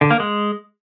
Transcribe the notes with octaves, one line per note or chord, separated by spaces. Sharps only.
D3
A#3
G#3